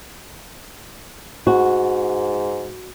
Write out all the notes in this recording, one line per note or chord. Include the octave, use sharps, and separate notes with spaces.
G#2 F#4